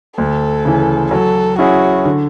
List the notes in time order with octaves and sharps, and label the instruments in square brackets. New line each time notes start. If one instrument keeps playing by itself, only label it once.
[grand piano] D2 [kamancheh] A4
[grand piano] C#3 E3
[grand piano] F#3 [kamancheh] A4
[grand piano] C#4 E4 G#4 [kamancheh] F#4
[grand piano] D3